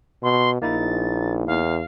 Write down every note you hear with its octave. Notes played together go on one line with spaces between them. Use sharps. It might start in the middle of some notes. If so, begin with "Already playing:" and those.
B2 C6
A#1 A#3 D#4 E4 A6
E2 F5